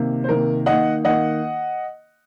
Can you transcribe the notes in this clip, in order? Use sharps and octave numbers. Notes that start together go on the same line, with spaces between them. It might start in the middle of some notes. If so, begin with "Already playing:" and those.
Already playing: C3 D#3 A#3
C5
C3 D#3 A#3 A#4
D#3 A#3 D#4 D#5 F#5
D#3 A#3 D#4 D#5 F#5